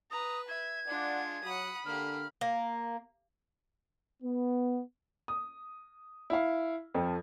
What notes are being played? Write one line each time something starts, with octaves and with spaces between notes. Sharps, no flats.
B4 A#5 D#6
E5 G#6
G#3 D4 F4 D5 F#5
F#3 F#5 B5 D#6
D3 A#3 G4 F6
A#3
B3
D#6
E4 F5
F2 F3 A4